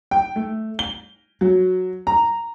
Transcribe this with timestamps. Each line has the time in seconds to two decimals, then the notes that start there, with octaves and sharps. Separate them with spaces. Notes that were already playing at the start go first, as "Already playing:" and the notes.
0.11 G5
0.36 A3
0.79 G7
1.41 F#3
2.07 A#5